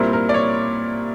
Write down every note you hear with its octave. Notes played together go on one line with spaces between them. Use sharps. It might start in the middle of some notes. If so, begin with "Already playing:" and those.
Already playing: A#2 G3 C4 E4 A#4
A#4
D5
C#5